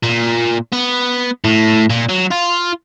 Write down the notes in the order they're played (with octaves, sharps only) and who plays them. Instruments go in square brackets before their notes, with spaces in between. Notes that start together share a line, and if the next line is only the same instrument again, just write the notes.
[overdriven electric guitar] A#2
B3
A2
A#2
F#3
F4